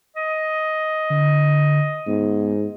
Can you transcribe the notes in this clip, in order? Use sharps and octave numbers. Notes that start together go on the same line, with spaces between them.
D#5
D3
G#2 B3